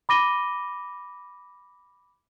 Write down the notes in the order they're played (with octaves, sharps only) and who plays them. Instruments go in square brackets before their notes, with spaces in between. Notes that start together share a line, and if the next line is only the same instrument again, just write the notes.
[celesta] B5 D6 A#6 D#7 G7